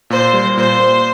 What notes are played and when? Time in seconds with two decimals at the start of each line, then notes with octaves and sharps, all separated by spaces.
0.10 A#2 C5
0.33 G3
0.57 A#2 C5
0.80 A#2